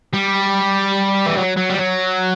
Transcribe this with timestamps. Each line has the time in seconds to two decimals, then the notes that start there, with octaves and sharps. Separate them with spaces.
0.14 G3
1.26 E3
1.37 F#3
1.56 F#3
1.69 G3
1.77 F#3